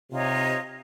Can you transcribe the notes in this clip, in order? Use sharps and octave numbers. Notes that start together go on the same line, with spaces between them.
C3 D#4 F4 C#5